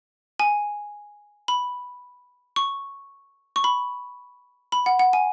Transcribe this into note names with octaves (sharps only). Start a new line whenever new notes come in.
G#5
B5
C#6
C#6
B5
B5
F#5
F#5
G#5